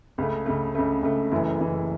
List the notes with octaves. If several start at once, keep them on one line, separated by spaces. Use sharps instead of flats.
C#2 C#3 A3
C#2 C#3 A3
C#2 C#3 A3
C#2 C#3 A3
F#1 F#2 E3 A3 E4
F#1 F#2 E3 A3 E4